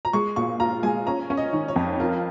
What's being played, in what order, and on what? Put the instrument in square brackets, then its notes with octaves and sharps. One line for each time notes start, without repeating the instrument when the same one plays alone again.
[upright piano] A#5
[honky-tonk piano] G#3 [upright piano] C#6
[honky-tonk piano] A#2 [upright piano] C#6
[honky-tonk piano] F4 [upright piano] A#5
[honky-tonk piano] G#3 [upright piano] G#5
[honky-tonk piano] C#4 [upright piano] A#5
[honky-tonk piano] C#4
[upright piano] D#5
[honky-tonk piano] D#3
[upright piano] C#5
[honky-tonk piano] F2
[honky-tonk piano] F4 [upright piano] A#4